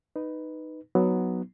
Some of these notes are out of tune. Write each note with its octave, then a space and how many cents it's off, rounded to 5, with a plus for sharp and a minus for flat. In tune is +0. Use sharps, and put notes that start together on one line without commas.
D#4 -5 B4 +0
F#3 +0 B3 +0 D#4 +5